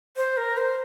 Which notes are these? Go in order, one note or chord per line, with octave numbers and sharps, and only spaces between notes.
C5
A#4
C5